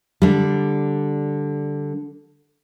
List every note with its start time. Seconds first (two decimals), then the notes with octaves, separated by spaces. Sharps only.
0.22 D3 G3